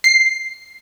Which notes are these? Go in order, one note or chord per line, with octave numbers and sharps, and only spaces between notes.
C7